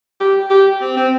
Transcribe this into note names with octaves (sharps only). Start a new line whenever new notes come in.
G4
G4
C4
C4